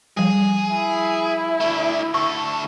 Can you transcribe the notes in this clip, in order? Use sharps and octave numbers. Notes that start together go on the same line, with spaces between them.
F3 G3 G#4
E4
A3 D4
D2 A4 C#6